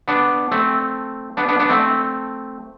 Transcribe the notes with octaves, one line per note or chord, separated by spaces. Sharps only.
B3 D4
A3 C4
B3 D4
B3 D4
B3 D4
A3 C4